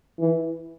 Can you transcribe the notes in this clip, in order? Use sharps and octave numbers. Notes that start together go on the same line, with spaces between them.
E3